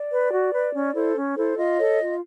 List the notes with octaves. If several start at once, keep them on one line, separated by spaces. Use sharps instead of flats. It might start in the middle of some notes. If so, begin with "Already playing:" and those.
Already playing: D5
B4
F#4
B4
C#4
E4 A4 C5
C#4
E4 A4 C5
F4 D#5
A4 C#5
F4